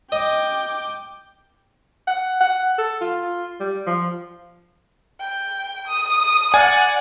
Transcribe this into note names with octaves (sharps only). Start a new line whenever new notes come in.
D#5 G5 D6
F#5
F#5
A4
F4
G3
F3
G5
D#6
D5 F#5 G#5